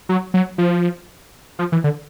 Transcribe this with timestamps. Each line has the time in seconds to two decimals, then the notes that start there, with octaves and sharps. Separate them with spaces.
0.09 F#3
0.34 F#3
0.58 F3
1.59 F3
1.72 E3
1.84 D3